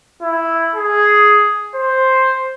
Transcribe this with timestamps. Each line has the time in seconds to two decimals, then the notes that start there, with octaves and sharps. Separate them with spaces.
0.22 E4
0.75 G#4
1.75 C5